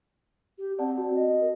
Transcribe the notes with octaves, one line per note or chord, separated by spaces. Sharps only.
G4
C4 D5 F#5 A5
F#4
D#5
A#4